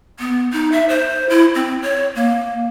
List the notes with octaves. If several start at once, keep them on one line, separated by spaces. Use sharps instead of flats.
B3
D#4
E5
C5
E4
C4
C#5
A#3